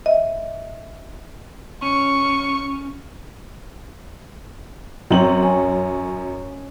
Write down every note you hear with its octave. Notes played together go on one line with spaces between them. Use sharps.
D#5 E5
C#4 C#6
F#2 C4 C#5 D#5 F#7
C#4